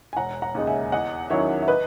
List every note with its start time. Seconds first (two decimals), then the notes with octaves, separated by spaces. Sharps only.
0.13 G#5
0.17 E1 F#5 A#5
0.42 F#5 A#5
0.55 D#2 C#3 G#3 D#4
0.67 E5 G#5
0.92 E2 D#5 F#5
1.30 D#3 F#3 C#4 E4 C#5 E5
1.62 E5
1.68 B4 D#5